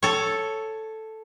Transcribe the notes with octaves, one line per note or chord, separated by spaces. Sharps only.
A4 C#5